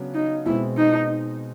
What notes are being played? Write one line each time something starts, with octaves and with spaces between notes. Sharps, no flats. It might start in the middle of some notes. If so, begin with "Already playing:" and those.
Already playing: C#3 F#3 B3 D4
D#4
B2 G#3 C4 E4
D#4